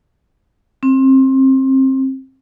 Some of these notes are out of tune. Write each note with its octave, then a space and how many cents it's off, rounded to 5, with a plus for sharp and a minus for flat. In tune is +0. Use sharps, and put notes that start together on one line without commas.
C4 +25